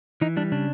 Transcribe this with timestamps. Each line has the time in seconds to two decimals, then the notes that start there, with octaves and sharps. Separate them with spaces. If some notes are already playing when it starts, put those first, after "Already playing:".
0.21 E3 D#4
0.36 G3 D4
0.52 C#3 D4